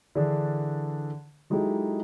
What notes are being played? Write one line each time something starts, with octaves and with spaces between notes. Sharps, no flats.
D3 E3 D4 G#4 A4
F#3 G#3 D#4 E4 G4 A4